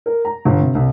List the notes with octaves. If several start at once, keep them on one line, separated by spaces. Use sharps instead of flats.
A#4
A#5
G1
C3
C2